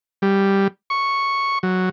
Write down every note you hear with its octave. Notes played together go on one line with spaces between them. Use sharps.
G3
C#6
F#3